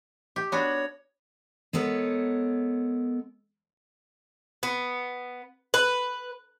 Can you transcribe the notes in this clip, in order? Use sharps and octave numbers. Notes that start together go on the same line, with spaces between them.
G4
B3 D4 F#4 C#5
G#3 B3 A4 A#4 C#5
B3
B4